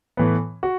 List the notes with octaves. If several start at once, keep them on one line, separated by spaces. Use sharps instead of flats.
A2 E3 B3
F#4